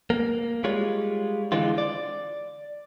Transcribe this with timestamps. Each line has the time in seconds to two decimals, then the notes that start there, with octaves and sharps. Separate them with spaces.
0.10 A#3
0.64 G3 G#3 F4 C#5
1.52 D3 E3 G#3 C4 F4
1.78 D5